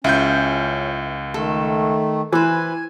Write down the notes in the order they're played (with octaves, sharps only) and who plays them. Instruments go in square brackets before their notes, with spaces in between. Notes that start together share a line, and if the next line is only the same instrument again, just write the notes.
[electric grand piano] C#2 G6 [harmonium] C#4 [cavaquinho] E4 F4
[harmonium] D#3 A3 [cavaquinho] A4
[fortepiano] E3 [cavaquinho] B4 C5 [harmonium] G#5